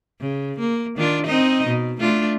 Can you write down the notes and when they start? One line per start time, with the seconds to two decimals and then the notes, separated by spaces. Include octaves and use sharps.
0.20 C#3
0.59 A#3
0.97 D#3 D4 F4
1.26 C4 D#4 D#5
1.68 B2
2.00 A3 D4 F4